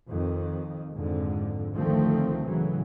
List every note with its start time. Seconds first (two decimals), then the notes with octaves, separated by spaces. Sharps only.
0.11 F2 D#3
0.94 F2 G#2 D3
1.75 D2 D3 D#3 F3 A3 C4
2.46 A2 C#3 E3 F#3